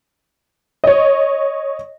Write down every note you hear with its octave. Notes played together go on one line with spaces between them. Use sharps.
C#5 D#5